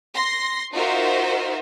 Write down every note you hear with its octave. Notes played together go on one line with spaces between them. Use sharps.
C6 A#6
D#4 F4 F#4 A#4 C5 E5